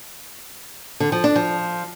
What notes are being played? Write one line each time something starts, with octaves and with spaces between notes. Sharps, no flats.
D3
F3
D4
F3